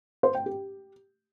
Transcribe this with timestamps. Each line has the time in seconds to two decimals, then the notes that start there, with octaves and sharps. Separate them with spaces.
0.23 C5
0.35 G5
0.46 G4